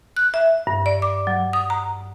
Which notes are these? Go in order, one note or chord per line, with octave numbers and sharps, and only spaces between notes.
F#6
E5
G2
D5
D6
F#3
D#6
A#5